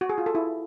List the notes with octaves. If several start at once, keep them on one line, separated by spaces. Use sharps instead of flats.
F#4
G#4
F4
A4
E4